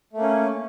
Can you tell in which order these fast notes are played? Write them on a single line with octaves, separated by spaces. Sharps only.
A3 A#3 C#4